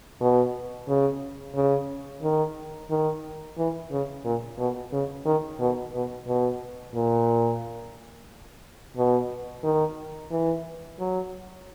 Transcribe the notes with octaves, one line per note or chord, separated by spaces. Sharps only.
B2
C#3
C#3
D#3
D#3
E3
C#3
A#2
B2
C#3
D#3
B2
B2
B2
A#2
B2
D#3
E3
F#3